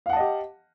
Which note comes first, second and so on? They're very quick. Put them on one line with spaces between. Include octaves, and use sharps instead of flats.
F5 F#5 A5 D#5 G4